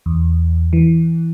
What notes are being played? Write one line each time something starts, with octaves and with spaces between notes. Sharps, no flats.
E2
E3